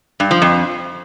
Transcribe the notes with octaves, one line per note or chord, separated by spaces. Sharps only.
G2
F3
F2